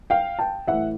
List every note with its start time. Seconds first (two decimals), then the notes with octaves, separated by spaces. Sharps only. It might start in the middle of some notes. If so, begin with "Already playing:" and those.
0.10 F5 G5
0.39 G5 A5
0.67 A2 E3 E5 F#5